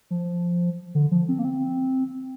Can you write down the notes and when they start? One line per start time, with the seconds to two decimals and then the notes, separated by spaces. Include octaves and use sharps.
0.11 F3
0.95 D3
1.12 F3
1.29 C4
1.39 A#3
1.45 C4